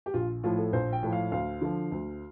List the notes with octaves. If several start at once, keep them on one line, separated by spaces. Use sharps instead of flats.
G4
A#1 F4
A2 F3 F4
A4
A#1 C5
G5
A2 F3
F5
D2 F5
D3 F3
D2